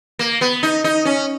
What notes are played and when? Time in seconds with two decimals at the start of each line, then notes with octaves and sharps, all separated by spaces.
0.19 A#3
0.41 B3
0.63 D#4
0.84 D#4
1.05 C#4